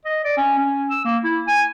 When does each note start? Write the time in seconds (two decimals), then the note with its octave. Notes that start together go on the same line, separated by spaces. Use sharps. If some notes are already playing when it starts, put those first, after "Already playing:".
0.05 D#5
0.24 D5
0.37 C#4
0.58 C#4
0.90 E6
1.05 A#3
1.24 E4
1.47 G#5